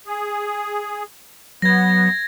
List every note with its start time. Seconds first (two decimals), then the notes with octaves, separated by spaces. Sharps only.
0.07 G#4
1.62 F#3 B3 G#6 A#6